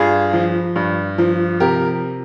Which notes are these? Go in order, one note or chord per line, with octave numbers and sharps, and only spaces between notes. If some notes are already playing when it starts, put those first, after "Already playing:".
Already playing: G2 F4 G#4
F3
G2
F3
C3 G4 A#4